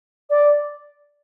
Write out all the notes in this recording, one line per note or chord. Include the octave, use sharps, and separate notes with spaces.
D5